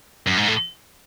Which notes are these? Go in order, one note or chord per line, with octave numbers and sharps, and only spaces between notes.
F#2
G#2
A2